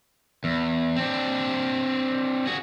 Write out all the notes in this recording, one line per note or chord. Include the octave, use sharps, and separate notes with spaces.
E2
C4 D4
F#4 G#4